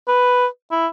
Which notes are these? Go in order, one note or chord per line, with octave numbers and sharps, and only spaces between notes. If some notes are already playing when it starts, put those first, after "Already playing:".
B4
E4